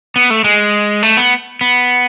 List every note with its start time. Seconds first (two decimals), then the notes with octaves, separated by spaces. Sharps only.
0.16 B3
0.30 A3
0.44 G#3
1.03 A3
1.17 B3
1.61 B3